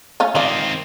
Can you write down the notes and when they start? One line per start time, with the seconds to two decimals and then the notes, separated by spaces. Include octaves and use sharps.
0.20 A3 C#4 F4
0.35 D#3 C4 F4 D5